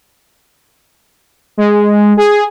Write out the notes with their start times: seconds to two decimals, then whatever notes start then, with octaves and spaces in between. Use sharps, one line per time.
1.57 G#3
2.17 G#4